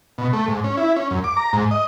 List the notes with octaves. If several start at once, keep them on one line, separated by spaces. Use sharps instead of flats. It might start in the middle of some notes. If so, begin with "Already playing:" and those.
B2
A3
G#2
C#4
E4
C#4
F#2
D6
A#5
G#2
D#5